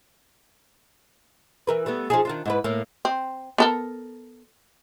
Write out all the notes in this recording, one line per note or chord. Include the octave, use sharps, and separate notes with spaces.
E3 A#4 B4
G3 A3 B3
F3 D#4 G#4
D#3 D4 F4
G#2 E4 B4
A2 A#3
C4
B3 A4 A#4